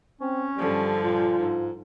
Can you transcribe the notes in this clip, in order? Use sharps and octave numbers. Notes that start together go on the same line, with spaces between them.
C4 C#4
G2 D3 F3 G3
A#2 F4
G#2